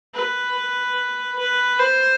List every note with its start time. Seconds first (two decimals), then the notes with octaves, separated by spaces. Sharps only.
0.14 B4
1.38 B4
1.79 C5